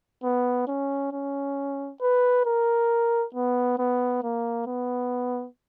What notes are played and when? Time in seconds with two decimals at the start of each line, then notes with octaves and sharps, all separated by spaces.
0.23 B3
0.67 C#4
1.12 C#4
2.01 B4
2.46 A#4
3.34 B3
3.78 B3
4.23 A#3
4.67 B3